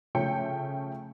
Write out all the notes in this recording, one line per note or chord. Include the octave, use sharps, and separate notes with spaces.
C#3 F3 A3 C#4 G5 C#7